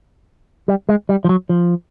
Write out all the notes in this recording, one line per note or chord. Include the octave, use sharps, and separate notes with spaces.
G3
G#3
G3
F3
F#3
F3